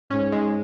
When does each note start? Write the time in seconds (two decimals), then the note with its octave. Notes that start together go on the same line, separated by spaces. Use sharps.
0.11 G#2 C#4
0.32 G#3